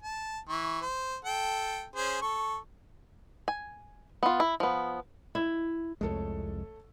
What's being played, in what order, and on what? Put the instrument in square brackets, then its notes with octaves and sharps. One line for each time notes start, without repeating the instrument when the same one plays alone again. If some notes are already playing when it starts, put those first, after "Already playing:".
[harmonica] A5
E3 C#6
C5
A4 G5
C#4 G#4 C5
A4 C#6
[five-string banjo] G#5
B3 F4
E4
F3 B3
[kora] E4
[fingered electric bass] C2 F2 G#3 [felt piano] A3 A4 C#5